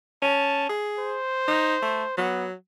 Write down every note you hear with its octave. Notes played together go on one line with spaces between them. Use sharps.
C#4 A5
G#4
C5
D#4
A3
F#3 B3